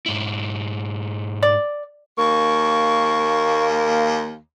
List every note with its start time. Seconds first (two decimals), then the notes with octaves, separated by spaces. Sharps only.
0.06 G#2 E4
1.43 D5
2.18 D#2 A#3 C#6